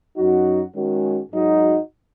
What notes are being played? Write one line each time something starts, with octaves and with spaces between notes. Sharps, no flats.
F#2 F#3 D#4 F#4
D#3 G#3 C#4 F#4
G#2 F#3 D#4 F#4